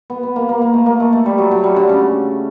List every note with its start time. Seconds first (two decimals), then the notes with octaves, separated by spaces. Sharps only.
0.10 B3
0.23 B3
0.36 A#3
0.49 A#3
0.62 A#3
0.74 A3
0.86 A#3
1.00 A3
1.13 A3
1.26 G3
1.38 F#3
1.51 F#3
1.64 G3
1.76 D3
1.89 C#3